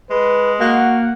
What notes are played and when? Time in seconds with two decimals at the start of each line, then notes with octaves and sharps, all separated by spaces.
0.10 G#3 B4
0.61 A#3 F#4 F#5